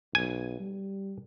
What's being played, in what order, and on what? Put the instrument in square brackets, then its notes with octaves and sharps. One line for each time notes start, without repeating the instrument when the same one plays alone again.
[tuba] B1 [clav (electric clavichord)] G#5
[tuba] G3